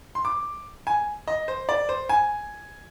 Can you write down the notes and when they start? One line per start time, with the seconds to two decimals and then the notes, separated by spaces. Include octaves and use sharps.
0.15 C6
0.25 D6
0.87 G#5
1.28 D#5
1.48 C5
1.69 D5
1.89 C5
2.09 G#5